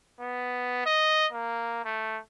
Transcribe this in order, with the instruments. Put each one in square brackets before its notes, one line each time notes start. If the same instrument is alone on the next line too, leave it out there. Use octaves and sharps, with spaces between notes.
[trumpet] B3
D#5
A#3
A3